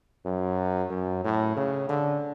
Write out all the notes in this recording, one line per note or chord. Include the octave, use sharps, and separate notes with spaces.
F#2
F#2
A2
C#3
D3